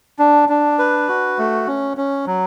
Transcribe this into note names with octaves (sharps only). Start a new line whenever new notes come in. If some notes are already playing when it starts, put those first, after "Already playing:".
D4
D4
B4
F#4
A3
C#4
C#4
F#3